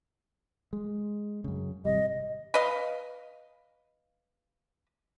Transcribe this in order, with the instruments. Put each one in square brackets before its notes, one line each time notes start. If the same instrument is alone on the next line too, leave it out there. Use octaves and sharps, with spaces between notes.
[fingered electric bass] G#3
F#2 C#3
[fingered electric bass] G#1 C3 G3 [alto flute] D#5
[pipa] B4 D#5 F5